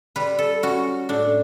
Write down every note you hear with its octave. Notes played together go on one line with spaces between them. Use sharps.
G3 B4
A4
C#4 F#4
A2 D4